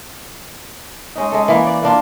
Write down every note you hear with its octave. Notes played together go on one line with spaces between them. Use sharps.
G#3 C#4 D#4
G#3 A4
E3 A#3
D5
A#3 D4 F4